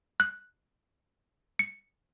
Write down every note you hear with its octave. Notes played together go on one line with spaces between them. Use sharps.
F#6
C#7